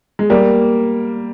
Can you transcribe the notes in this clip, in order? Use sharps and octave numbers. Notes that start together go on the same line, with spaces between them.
G#3
G3 A#3